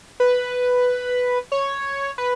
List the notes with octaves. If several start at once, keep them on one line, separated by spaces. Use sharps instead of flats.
B4
C#5
B4